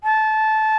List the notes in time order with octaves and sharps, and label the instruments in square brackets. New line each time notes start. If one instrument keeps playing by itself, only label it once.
[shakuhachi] A5